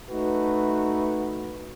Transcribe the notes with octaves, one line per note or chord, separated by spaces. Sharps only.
A3 D#4 F#4 B4